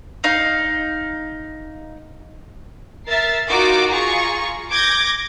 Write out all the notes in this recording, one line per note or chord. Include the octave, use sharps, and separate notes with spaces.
D#4 F5
A#4 E5 A6 C7
D#4 F4 F#4 A#4 D6
F4 G#4 A#5 C#6
D6 G6 G#6 A#6